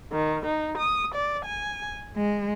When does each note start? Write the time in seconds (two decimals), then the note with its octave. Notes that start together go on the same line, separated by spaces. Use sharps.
0.12 D#3
0.46 D#4
0.80 D#6
1.15 D5
1.45 G#5
2.15 G#3